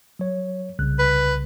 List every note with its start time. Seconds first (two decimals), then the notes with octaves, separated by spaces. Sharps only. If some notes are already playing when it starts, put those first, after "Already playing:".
0.19 F#3 C#5
0.79 C2 C#3 F#6
0.99 B4